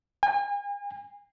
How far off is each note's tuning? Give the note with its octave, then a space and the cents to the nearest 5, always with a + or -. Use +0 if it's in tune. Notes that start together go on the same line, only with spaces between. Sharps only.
G#5 -40